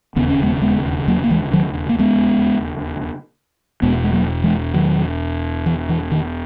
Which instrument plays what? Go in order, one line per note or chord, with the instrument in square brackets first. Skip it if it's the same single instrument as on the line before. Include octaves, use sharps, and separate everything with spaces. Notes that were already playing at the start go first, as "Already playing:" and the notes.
[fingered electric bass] E1 D#2 C#3 B3
C#4
G#3 B3
G#3 B3
F#3 A#3
A#3
E3 G#3
D#3 F#3
A#3
G#3 B3
E1 E2 B2 G#3 B3
G#3
F#3 A#3
E3 G#3
D#3 F#3
E3
E3
D#3